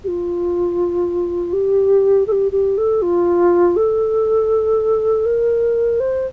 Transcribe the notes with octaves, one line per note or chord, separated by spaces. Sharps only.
G4
F4
G4
A4
G4
G4
A4
F4
A4
A#4
C5